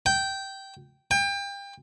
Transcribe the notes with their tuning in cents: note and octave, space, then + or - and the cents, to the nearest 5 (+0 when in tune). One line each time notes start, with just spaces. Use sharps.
G5 -10
G5 +30